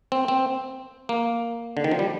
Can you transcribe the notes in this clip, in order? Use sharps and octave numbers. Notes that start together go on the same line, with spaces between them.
C4
C4
A#3
D3
D#3
F3
G3